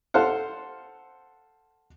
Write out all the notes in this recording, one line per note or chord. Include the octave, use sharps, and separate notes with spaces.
A4 C5 F5 F#5